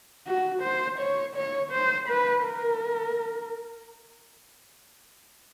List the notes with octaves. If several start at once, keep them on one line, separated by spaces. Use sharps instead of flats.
F#4
C5
C#5
C#5
C5
B4
A#4